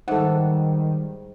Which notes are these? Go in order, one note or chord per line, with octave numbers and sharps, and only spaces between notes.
G#2 D#3 G3 A4 E5 F#5